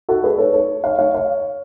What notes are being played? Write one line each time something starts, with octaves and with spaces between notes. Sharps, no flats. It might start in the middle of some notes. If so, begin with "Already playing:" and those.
F#4 A4
G#4 B4
A4 C#5
A4 C#5
C#5 F5
C#5 F5
C#5 F5